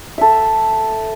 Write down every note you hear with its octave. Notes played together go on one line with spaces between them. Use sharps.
A4 E5